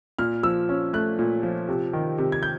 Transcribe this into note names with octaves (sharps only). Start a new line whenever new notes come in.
A#2 F6
F3 E6
C#4
A3 F#6
A#2
F3
C3
D#3
C3
G#6
G6